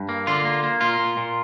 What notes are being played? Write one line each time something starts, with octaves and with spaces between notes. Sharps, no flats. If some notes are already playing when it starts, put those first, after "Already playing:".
Already playing: G2
A#3
D3 F4
A#3
A#3
A#2 F4
A#2
A#2